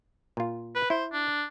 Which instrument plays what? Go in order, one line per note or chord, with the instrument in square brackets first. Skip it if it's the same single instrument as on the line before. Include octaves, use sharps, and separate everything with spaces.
[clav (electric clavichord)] A#2 F4
[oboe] B4
[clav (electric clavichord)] E4 [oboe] C5
[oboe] D4